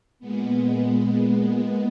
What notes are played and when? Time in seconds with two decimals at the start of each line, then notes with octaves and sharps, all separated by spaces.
0.19 A#2 G#3 B3